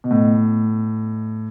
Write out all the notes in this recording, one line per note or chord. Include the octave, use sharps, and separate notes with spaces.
B2
A2